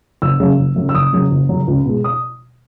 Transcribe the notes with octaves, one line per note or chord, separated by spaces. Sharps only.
F#1 E6
F#2 C#3 F#3
F#1
F#2 C#3 F#3
E6
F#1 D#6
F#2 C#3 F#3
F#1
F#2 C#3 F#3
C#2
B2 G#3
D#6